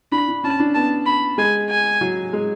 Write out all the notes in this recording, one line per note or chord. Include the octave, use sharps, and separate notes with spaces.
D4 B5
D4
C#4 A5
D4
B3 A5
B5
G#3 G#5
G#5
F#3
G#3